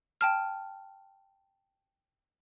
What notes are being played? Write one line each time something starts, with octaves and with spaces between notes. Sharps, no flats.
G5 A5 F6